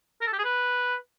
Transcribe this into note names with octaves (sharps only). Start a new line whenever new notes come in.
A#4
A4
G4
G#4
B4